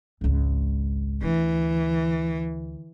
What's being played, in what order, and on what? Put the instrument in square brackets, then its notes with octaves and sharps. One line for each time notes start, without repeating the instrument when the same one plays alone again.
[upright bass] G#1 C#2
[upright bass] D2 D3 [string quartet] E3